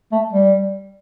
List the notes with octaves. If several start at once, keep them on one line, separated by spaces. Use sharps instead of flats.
A3
G3